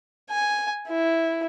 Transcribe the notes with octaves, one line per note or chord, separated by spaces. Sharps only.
G#5
E4